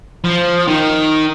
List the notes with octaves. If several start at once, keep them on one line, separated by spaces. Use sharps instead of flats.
F3
D#3